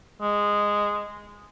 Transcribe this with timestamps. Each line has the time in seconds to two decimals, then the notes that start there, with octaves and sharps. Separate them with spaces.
0.21 G#3